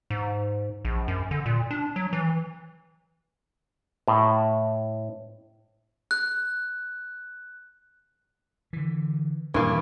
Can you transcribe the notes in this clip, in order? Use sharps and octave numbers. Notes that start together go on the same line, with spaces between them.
G#2
A#1
F#2
D3
A#2
D4
F#3
E3
A2
F#6
D3 E3
D#1 G2 E3 A#3